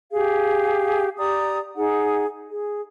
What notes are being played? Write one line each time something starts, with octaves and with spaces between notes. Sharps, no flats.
G4 G#4 F5
G4 D5 A#5 D#6
D#4 G#4 F#5
G#4